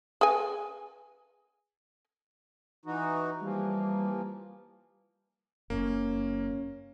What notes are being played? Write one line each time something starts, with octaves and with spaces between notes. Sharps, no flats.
G#4 B4 G#5
E3 D#4 F#4
E3 F3 G3 A#3
F#1 F#2 A#3 C#4